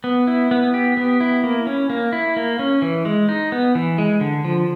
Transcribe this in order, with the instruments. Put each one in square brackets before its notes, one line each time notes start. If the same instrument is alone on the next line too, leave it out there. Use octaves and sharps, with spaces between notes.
[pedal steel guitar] B3
E4
B3
G4
B3
E4
A#3
C#4
A#3
E4
A#3
C#4
E3
G#3
D#4
B3
E3
G#3
D3
F3